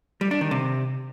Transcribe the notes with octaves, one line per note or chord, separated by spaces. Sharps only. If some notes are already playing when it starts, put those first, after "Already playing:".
G3
D4
D#3
C3